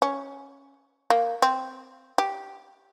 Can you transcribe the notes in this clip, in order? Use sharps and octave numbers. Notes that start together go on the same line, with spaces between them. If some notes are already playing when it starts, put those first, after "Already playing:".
C#4
A#3
C4
G4